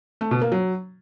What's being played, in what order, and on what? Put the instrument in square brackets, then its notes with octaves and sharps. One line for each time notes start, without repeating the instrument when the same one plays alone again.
[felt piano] A3
B2
A#3
F#3